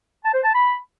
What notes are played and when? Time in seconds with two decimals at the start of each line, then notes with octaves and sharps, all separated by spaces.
0.24 A5
0.34 C5
0.43 A5
0.53 B5